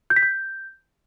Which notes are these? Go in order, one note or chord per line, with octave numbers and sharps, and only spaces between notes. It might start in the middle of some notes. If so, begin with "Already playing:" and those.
G6
B6
G6